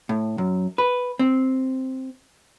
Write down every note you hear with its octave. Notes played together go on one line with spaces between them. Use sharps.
A2
F#2
B4
C4